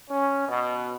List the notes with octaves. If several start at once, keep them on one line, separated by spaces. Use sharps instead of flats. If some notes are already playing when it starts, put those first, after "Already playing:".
C#4
B2